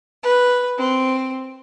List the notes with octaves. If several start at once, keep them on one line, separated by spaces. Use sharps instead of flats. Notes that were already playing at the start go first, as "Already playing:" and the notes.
B4
C4